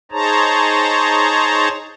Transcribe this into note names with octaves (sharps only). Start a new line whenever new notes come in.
D#4 G#4 C5 C#5 A5 A#5